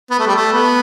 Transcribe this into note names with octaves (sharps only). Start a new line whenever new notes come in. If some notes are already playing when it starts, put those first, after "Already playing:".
B3
A3
G3
A3
B3